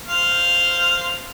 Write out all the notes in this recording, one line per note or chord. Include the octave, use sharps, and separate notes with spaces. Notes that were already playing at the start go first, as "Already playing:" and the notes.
C5 F5